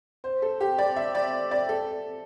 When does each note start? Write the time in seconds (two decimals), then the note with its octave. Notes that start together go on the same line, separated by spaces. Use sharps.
0.24 C5
0.42 A4
0.61 G4
0.78 D5
0.96 E5
1.15 D5
1.51 D5
1.69 A4